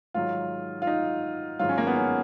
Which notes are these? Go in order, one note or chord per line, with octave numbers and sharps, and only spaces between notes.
G#2 D#3 F#3 F4
F4
D#4
G#2 D#3 F#3 F4
C#4
A#3
B3
C#4